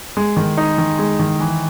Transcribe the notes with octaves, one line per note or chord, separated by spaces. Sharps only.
G#3
D#3
D#4
D#3
G#3
D#3
E3